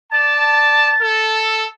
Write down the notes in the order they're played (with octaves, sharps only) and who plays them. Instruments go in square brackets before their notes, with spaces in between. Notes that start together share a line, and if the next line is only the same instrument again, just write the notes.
[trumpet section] D5 A5 [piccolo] A6
[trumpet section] A4